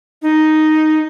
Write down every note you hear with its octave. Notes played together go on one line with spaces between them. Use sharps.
D#4